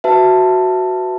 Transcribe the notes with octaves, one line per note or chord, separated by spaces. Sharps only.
F#4 B4 E5 A5